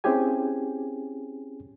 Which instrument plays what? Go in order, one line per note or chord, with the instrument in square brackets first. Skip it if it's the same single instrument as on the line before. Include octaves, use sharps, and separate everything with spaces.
[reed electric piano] C4 C#4 E4 G4 G#4 G#5